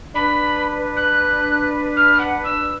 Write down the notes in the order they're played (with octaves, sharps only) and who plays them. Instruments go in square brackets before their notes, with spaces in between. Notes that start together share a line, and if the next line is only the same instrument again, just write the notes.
[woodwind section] D4 B4 [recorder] B5
[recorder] F#6
F6
F#5
E6